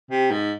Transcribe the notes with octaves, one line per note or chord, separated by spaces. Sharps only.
C3
G#2